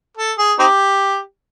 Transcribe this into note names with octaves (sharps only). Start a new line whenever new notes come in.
A4
G#4
C4 D#4 G4